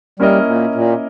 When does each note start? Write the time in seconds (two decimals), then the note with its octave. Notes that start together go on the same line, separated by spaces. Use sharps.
0.20 G3 A#3 C#4 E4 A#4 D#5
0.47 A#2
0.75 A#2